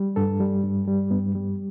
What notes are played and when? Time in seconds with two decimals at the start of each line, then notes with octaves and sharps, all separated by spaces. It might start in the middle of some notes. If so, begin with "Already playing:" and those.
Already playing: G3
0.16 G2 A4
0.40 G3
0.64 G2
0.88 G3
1.11 G2 B3
1.35 G3